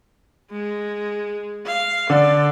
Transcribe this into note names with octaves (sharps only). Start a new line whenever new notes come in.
G#3
F5
D3 A4 D5